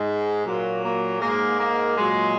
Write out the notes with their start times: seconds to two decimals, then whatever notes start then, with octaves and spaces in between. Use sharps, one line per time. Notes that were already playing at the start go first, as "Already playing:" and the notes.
Already playing: G#2 G#3
0.45 A#2 F#3 A#3
0.83 A#3
1.21 G#2 G#3 A#3
1.59 A#3
1.98 A#2 F#3 G#3